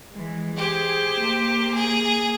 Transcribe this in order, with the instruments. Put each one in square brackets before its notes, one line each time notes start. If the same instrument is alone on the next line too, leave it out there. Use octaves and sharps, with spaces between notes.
[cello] E3 G#3
[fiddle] G4 C5 [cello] G#4
[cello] A#3
[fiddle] G#4